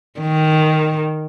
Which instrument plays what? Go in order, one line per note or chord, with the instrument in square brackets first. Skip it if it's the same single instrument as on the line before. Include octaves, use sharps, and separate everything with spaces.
[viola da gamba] D#3